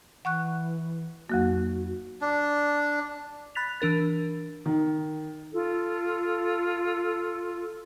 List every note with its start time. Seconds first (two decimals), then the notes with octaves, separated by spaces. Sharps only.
0.25 E3 F#5 C#6 F#6
1.30 F2 F#3 A#3 F#4
2.21 D4
3.55 B5 F#6 A6 B6 F7
3.81 E3 D4 A#4 A6
4.66 D#3
5.53 F4 A4